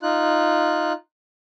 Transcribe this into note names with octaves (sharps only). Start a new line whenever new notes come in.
D#4 F4 F#6